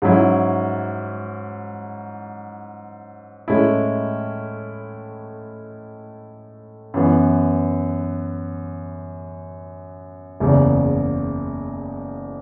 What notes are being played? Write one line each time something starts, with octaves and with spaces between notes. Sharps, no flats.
G#2 F#3 C#4 E4
A2 G#3 C#4 E4
F#2 E3 B3
F#1 E2 C#3